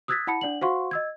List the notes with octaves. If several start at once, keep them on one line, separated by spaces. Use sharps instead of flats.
D#6 E6 F#6 G#6 A6 B6
E4 F#5 A5 B5 C#7
D4 D5 F#5 F#7
F#4 C5 F5 F#5 C6 C#6
D#5 E6 G#6